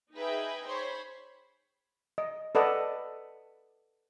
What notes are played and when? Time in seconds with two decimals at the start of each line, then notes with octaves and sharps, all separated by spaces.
0.14 D#4 G#4 B4 E5 G5 B5
0.67 C5 C#5 B5
2.18 D#5
2.55 A4 B4 D5 D#5 F#5